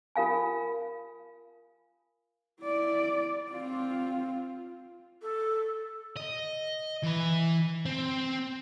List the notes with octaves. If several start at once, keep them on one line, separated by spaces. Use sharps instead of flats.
F4 A#4 F5 G#5
E4 D5
C4 F4
A4
D#5
E3 B4
C4